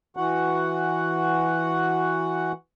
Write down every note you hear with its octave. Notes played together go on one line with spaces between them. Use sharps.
E3 F#4 F#5